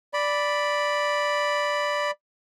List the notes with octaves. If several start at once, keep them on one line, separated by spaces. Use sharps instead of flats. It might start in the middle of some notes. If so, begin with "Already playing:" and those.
D5 B5